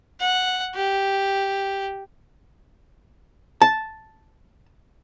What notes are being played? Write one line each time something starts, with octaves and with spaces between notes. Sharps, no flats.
F#5
G4
A5